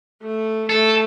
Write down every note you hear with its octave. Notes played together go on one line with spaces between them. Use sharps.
A3
A3 A4